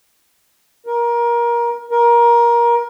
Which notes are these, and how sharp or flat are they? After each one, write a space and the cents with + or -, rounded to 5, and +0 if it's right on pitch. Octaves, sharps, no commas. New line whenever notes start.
A#4 +20
A#4 +20